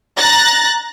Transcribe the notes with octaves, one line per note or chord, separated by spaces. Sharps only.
A#5 F#6 A6 A#6